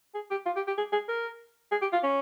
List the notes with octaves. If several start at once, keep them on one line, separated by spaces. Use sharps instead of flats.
G#4
G4
F4
G4
G4
G#4
G#4
A#4
G#4
G4
F4
C#4